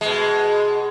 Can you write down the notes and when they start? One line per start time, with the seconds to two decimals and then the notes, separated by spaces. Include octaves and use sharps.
0.01 B2 G#3